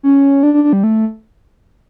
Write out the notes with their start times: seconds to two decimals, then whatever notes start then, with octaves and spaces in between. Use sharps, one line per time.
0.03 C#4
0.43 D4
0.54 D4
0.64 D4
0.73 G3
0.84 A3